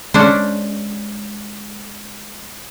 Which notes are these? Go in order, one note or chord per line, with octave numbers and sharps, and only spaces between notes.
G#3 C#4 D4 C5